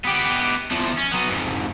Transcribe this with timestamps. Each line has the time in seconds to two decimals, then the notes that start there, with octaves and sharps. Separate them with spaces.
0.05 B3 G4
0.71 E2 F3
0.98 C#4
1.12 F#3 B3
1.30 F2 G#2